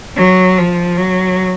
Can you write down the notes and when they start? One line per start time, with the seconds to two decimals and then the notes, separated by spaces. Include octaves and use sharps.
0.16 F#3
0.58 F3
0.97 F#3